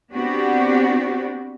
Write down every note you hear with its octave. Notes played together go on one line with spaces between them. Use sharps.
B3 C4 D4 F#4 G4